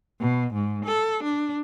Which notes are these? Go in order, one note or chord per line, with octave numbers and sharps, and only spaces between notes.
B2
G#2
A4
D4